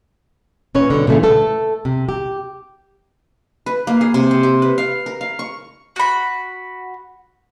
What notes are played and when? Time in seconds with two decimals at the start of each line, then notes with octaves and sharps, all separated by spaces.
0.75 A#2 C#4 B4 C#5
0.90 G2 B2 D3
1.07 A#2 C#3 E3 A3
1.23 A3 A4
1.85 C3
2.09 G4
3.66 B4
3.87 A#3
4.01 G#4
4.14 C3
4.31 C4
4.43 G4
4.62 B4
4.78 F5
5.06 A#4
5.21 F5
5.39 C#6
5.96 F#4 B5